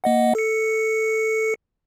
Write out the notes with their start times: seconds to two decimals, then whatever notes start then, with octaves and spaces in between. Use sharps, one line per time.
0.04 A#3 D#5 F#5
0.35 A4 C#7